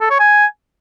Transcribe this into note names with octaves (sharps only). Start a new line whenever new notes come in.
A4
C#5
G#5